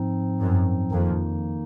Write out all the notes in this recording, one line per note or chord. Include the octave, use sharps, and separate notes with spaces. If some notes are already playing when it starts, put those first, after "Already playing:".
Already playing: G#2 F3 C4 D#4
F#2
F2 D#3 A#3 D#4